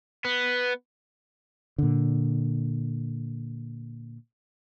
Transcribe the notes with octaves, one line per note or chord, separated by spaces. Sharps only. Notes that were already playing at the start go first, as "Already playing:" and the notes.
B3
A#2 D3